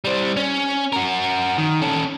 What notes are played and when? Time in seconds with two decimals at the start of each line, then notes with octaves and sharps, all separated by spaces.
0.05 G3 C5
0.37 C#4
0.93 F#4 A#4
1.58 D#3
1.82 C#4 A4